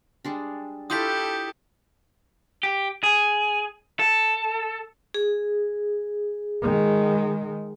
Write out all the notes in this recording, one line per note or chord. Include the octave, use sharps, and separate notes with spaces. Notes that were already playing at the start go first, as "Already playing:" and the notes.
G3 G#3 D4
E4 F4 G4 A4 A5 D#6 G6 B6
G4
G#4
A4
G#4
D#3 G#3